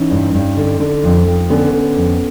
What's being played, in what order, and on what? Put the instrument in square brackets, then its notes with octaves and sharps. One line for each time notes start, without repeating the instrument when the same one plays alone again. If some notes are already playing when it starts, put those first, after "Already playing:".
Already playing: [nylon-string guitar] E3 C#4 D#4
G2
G2
D3
D3
F2
F2
D3 B3 C#4
D3
F2